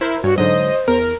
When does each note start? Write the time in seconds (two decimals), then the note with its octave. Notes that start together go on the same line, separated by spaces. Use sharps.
0.01 E4 A#4 C5
0.23 G2 F#4 C#5
0.38 G#2 D3 F#3 C5 D#5
0.88 E2 A#4